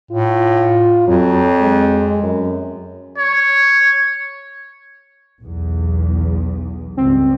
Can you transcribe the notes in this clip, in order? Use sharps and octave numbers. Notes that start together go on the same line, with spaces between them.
A2 F4
F2 F#3
G#3
F#2
C#5
B1 E2
C#2 G2 C4